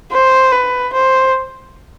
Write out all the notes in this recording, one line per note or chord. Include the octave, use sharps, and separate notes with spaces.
C5
B4
C5